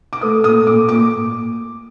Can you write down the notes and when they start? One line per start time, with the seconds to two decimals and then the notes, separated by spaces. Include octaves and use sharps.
0.13 D6
0.21 A3 D#6
0.44 A#2 D#6
0.67 A#2 D6
0.89 A#2 D6